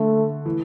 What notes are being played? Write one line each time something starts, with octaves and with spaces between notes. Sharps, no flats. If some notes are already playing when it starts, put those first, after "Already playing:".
Already playing: D3 A3
E3